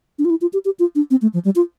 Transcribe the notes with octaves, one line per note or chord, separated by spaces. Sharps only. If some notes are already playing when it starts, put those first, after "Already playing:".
D4
F4
E4
F4
G4
G4
F4
D4
C4
A3
F3
G3
F4